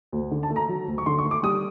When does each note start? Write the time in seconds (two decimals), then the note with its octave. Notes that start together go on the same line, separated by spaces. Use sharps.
0.12 D2
0.31 D3
0.43 A5
0.50 A3
0.56 A#5
0.69 F#3
0.87 D2
0.98 C#6
1.06 D3 C6
1.18 C#6
1.25 A3
1.31 D6
1.43 G3 D#6